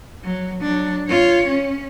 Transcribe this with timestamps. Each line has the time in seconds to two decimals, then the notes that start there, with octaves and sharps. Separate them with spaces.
0.24 F#3
0.61 F#3 D4
1.09 F4 C#5
1.47 C#4